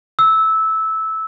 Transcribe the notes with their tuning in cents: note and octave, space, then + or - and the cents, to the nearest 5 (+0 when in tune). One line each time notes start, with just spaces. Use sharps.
E6 -15